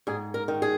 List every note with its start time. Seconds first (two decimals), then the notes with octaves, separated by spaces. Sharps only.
0.07 G#2 G#4
0.34 A#4
0.48 D#3
0.62 G#4